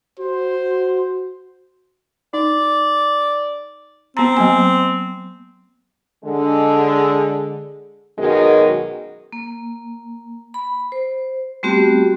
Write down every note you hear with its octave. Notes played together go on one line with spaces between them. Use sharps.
F#4 C5
D#4 D5
B3 C4 A#5
F#3 A#3 G#5
D3 G#3
F#2 B2 D#3 G#3 D#5
A#3
B5
C5
G3 A3 B3 C4 F#4 G4